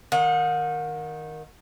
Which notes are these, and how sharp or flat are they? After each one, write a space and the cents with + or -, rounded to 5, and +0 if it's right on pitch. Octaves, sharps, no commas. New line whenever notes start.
D#3 +0 F#5 -40